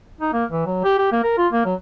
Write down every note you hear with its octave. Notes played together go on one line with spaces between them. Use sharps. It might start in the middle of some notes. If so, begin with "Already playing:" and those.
D#4
A#3
E3
F#3
G4
G4
A#3
A#4
F4
A#3
F#3